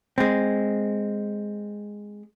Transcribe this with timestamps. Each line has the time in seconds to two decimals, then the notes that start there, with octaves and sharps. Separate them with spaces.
0.18 G#3 C4